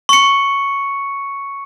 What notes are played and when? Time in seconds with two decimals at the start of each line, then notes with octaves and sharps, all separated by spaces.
0.09 C#6 C#7